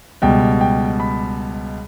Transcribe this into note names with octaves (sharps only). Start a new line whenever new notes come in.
C#2 B2 G3 G5
G5
B5